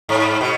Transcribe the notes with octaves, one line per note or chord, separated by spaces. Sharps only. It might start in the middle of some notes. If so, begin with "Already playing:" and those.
G#2
B2